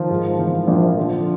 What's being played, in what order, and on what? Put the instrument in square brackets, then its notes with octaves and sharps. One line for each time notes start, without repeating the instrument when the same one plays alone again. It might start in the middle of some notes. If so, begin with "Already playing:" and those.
Already playing: [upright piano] D#3 [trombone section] F3
[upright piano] G#2
E3
A#1
[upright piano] D3 [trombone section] F3